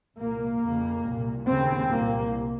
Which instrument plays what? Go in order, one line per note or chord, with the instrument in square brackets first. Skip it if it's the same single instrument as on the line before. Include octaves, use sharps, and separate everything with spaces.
[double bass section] C2 A#2 A#3
F2 C#3 A#3
C2 A#2
D#2 C#3 C4
C2 A#2 A#3